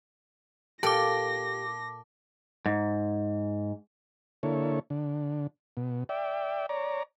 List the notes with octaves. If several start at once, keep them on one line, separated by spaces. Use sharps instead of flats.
A#2 G4 A4 A5 D6 A#6
G#2
D3 A#3 E4 A4 C#5
D3
B2
D5 E5 G5
C#5 D5 A#5